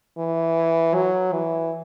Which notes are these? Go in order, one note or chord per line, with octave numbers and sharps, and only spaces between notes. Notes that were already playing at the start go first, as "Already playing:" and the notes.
E3
F#3
E3